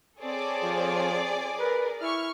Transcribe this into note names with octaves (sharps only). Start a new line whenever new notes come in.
C4 G#4 A4 C#5 D5
F3
A#4 B4
E4 C#6 F6